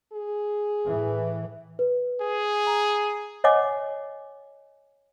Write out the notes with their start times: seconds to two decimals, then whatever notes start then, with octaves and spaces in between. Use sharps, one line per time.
0.13 G#4
0.86 A2 E3
1.79 B4
2.22 G#4
2.67 A#5
3.44 C#5 D#5 F#5 G#5 D6